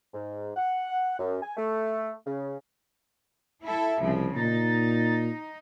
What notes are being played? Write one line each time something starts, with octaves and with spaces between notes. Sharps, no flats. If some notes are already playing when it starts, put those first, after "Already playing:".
G#2
F#5
F#2
G#5
A3
C#3
E4 A4 E5
C2 C#3 F3
A#2 D#4 A6